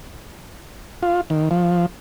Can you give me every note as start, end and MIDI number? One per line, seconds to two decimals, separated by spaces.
1.03 1.21 65
1.30 1.49 51
1.51 1.86 53